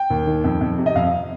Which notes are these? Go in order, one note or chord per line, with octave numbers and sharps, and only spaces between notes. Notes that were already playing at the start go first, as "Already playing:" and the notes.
Already playing: G5
D#2
D#3
F2
F2
C3
D#5
F2 F5